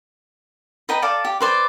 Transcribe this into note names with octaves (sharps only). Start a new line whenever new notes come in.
B4 D#5 G5 A#5
A4 D5 F5 A5
G4
B4 C5 D5